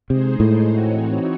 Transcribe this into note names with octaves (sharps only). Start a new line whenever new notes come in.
C3 G#3 D#4 G#4 C5
A2
E3 C4 D#4 F#4 C#5